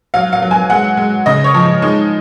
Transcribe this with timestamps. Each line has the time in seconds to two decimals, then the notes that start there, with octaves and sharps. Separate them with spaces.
0.14 F#3 F5
0.33 F5
0.42 F#3
0.51 G#5
0.70 G#3 F#5
0.97 G#3
1.26 C#3 D#5
1.44 C#5
1.54 F3
1.82 G#3 D#4